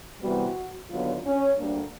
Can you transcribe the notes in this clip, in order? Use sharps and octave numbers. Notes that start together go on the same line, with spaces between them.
C3 E3 G3 B3 F#4
D#2 D3 F#3 B3 F4
C#4
D2 D3 G3 A#3 D4